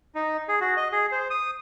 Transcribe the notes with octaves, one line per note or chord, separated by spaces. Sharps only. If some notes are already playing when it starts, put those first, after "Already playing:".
D#4
G#4
F#4
D#5
G#4
C5
D#6